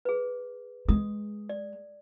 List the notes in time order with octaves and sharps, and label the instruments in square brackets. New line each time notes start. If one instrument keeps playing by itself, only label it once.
[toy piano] G#4 B4
[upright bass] G#3 [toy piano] D#6
[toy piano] D5